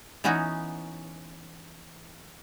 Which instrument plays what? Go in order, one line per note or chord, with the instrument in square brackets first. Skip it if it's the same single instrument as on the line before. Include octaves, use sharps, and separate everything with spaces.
[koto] E3 B3 C#4 D#4 F#4